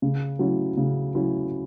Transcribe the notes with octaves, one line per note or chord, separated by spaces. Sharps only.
C#3
F#3 C#4 E4
C#3
F#3 C#4 E4